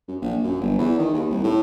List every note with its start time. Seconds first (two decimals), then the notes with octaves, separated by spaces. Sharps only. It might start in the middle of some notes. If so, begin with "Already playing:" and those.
0.08 F#2
0.21 A#1
0.44 F#2
0.61 G1
0.78 E2
0.98 D#3
1.14 D#2
1.30 C2
1.44 A2